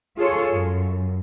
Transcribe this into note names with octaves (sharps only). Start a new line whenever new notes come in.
F4 G#4 A4 C#5
F#2